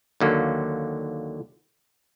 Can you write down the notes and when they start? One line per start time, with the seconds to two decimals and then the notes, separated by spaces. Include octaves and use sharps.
0.20 D#2 D3 F#3 A#3